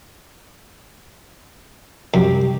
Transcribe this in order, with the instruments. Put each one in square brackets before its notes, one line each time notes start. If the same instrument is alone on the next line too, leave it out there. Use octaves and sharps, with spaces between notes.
[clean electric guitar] C2 G4 [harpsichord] F#2